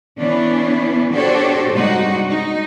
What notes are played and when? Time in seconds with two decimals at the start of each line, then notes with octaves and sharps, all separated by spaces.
0.18 E3 B3 C#4 D4 E4
1.12 D4 F#4 G4 A4 C5 C#5
1.71 G2 C3 G#3 D4 D#4 F#4
2.29 D#4